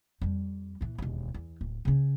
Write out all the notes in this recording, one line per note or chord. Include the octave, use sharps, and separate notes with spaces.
F2 G3
A#2 E3
E1 D#2
E2
D1
C#3 C#4